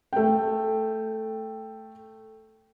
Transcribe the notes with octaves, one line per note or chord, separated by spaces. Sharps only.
A3 G5